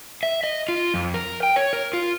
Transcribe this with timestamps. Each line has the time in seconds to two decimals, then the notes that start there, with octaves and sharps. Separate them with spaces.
0.23 E5
0.44 D#5
0.69 F4
0.94 F2
1.14 A#4
1.43 G5
1.56 C#5
1.73 A#4
1.93 F4